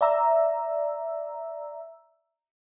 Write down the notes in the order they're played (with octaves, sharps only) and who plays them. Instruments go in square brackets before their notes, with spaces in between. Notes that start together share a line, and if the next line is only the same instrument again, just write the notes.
[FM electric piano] D5 E5 A#5 E6